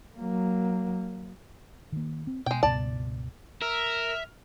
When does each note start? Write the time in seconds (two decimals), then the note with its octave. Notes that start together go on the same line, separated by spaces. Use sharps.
0.17 F#3 A#3
1.92 D#3 A#3
2.27 C4
2.46 B2 G#3 G5
2.63 C#2 G2 B2 D5 A5
3.62 A#4 E5 F6